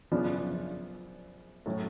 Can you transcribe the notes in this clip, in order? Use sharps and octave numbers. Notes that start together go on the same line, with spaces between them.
F#2 C#3 F3 B3 D4
A2 F#3 C#4